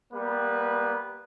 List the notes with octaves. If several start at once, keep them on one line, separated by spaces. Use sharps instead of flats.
G3 A#3 B3 B4